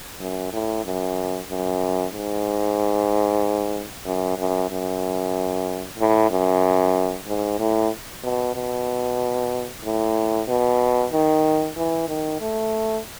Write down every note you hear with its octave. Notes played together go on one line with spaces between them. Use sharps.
F#2
A2
F#2
F#2
G#2
F#2
F#2
F#2
A2
F#2
G#2
A2
B2
B2
A2
B2
D#3
E3
D#3
A3